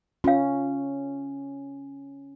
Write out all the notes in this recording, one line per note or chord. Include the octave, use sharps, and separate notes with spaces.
C#4 F4 F5